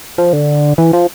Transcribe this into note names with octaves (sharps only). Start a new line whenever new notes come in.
F3
D3
E3
F3